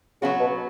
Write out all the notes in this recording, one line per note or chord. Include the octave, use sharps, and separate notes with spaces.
C#3 F#3 B3 F#4
B2